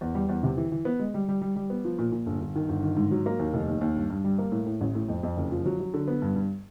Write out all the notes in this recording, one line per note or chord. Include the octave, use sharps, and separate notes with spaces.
E2
G3
E2
C3
E3
E3
B3
G#3
G3
G3
G3
G3
B3
F3
A#2
A#2
G1
G1
D#3
G1
D#3
G#2
F#3
A#3
D#2
F1
D#2
D#2
G2
G2
G3
A#3
A2
A2
A1
A2
F2
F2
F#1
F3
F#3
F#3
D3
B3
G2
G2